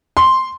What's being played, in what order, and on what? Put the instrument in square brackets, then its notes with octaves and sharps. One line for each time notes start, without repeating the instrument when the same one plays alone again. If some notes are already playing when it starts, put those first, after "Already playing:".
[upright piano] C6